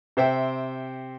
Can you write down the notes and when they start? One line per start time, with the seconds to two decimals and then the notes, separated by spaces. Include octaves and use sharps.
0.17 C3 C5 E5 G5